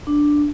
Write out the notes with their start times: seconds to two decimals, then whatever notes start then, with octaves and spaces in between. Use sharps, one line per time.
0.07 D4